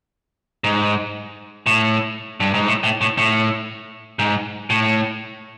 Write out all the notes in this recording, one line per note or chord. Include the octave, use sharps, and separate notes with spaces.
G#2
A2
G2
G#2
A2
A2
A2
A2
G#2
A2